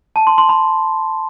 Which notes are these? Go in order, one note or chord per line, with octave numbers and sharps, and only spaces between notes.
A5
C6
C6
B5